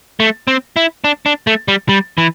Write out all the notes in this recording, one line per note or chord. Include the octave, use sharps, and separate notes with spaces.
A3
C4
E4
D4
D4
A3
G3
G3
E3